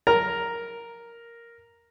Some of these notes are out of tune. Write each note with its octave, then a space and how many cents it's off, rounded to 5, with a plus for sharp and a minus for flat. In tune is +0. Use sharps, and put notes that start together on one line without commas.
A#4 +0 A#5 +0